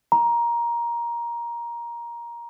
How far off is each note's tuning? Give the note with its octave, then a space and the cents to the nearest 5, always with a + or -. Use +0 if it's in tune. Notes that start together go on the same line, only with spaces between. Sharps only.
A#5 +15